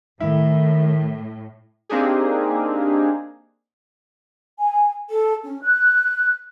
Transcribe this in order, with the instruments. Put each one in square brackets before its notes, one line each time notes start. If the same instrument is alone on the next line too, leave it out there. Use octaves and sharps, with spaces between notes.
[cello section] A2 [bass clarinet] D#3 [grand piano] E4
[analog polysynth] A#3 C4 D4 D#4 G4 G#4
[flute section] G#5
A4
C#4
F#6